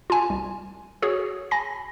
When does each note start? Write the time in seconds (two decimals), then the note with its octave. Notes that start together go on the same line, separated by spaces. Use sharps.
0.10 F4 G#5
0.30 C2
1.02 F#4 G#4 C#5
1.51 G#5 B5 A#6